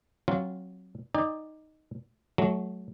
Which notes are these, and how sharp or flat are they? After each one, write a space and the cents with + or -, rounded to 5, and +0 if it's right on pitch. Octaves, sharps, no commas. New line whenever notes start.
F#3 +0 C4 +30 F4 +0
D#4 +0 D5 +10 G5 +45
F#3 +0 A3 -25